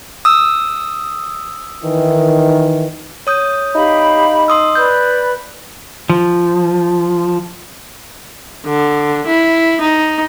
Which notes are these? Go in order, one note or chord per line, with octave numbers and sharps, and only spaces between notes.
D#6 E6
D#3 E3
C#5 D#6 G6
D#4 G4 F5 B5
C6 D#6 E6
B4 D5 B5 G6
F3
D3
E4
D#4